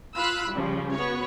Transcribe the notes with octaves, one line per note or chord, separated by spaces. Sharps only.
F4 F5 B5 E6 F#6
C#3 F3 G3
B3 F#4 C#5